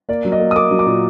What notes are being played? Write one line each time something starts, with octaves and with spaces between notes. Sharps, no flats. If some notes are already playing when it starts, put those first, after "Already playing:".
A#3 D5
F#3
D#5
A#3
D#6
A#3 D6
F#3
D6
A#2